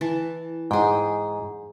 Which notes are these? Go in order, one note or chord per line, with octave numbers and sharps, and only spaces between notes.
E3 A5
G#2 G#4 G5